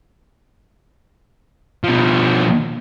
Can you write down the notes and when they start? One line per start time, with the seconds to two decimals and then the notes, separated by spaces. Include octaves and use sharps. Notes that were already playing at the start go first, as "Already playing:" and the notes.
1.84 B2 F3